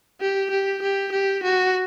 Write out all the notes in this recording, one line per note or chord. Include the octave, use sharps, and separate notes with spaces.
G4
G4
G4
G4
F#4